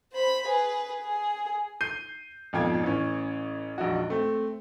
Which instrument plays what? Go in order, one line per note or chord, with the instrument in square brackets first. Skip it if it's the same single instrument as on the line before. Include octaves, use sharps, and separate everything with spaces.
[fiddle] C5 B5
G#4 B4
G#4
[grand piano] G6 C7 D#7
G#1 F2 B2 F4 G5 G#6
A1 E3 C#4
E1 A#1 D#4 F#4
A3 C4